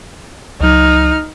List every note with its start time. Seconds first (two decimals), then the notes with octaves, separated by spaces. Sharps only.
0.61 C#2 F#3 D#4 F6